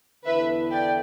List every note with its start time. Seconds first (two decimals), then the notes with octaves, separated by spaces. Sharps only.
0.25 E2 D3 B3 E4 A4 B4 E5
0.71 D5 G5